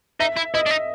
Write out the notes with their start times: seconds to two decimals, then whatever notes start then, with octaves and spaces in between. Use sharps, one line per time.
0.20 D#4 E5
0.36 E4
0.54 E4 D#5
0.66 D4
0.71 D#4